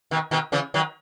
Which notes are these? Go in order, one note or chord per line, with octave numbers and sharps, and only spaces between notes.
B2 D#3
B2 D#3
C#3 E3
D#3 F#3